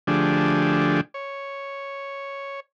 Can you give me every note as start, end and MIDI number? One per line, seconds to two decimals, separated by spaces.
0.07 1.01 50
0.07 1.01 53
0.07 1.01 57
0.07 1.01 62
0.07 1.01 67
0.07 1.01 68
1.14 2.60 73